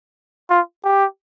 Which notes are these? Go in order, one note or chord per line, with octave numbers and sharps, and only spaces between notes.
F4
G4